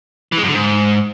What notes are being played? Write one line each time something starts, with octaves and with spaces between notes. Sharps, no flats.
E3
G#3
F#2
D3
G#2